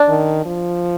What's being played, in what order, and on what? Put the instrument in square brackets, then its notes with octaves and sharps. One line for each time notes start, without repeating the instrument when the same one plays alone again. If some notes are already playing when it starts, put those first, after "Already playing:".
Already playing: [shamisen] D4
[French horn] D#3
F3